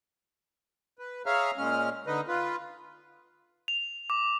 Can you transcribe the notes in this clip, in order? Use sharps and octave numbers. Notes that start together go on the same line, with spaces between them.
B4
G#4 C#5 E5 F5 A#5 F6
A#2 G#3 C#4 F6
D3 D#4 B4 D#5
F4 B4
F7
D6